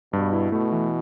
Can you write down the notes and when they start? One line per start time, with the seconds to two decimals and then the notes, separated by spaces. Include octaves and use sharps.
0.13 G2 B2
0.33 E4
0.52 B2 A3
0.72 E3